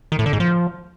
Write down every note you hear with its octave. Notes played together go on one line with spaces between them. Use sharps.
D#3
A2
D3
G#2
F3